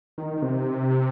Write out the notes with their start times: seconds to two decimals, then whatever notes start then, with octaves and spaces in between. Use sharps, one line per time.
0.18 D#3
0.37 D#3
0.42 C3